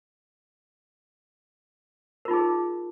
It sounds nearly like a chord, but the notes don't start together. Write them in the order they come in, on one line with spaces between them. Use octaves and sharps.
A#4 F4 D#4 G#4